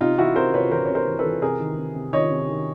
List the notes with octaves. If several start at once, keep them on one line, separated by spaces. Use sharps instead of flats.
C3 D#4 F4
E3 E4 F#4
C3 A#4 C5
C3 B4 C#5
E3 A#4 C5
C3 C#5
A#4 C5
E3
A4 B4
E3
C3 G#4 A#4
D#3
C3
C3
D#3 C#5 D#5
C3
D#3